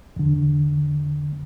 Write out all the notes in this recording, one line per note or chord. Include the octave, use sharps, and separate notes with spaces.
E2 D3